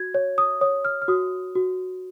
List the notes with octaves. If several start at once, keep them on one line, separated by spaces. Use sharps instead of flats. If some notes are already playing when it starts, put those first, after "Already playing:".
Already playing: F#4 G#6
C#5
D#6
C#5 D#6
F6
F6
F#4 D#6
F#4